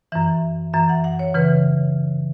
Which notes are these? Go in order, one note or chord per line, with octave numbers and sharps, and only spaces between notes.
F#2 E3 E5
F#2 E3 E5
F#5
F#5
C#5
C#3 E3 B4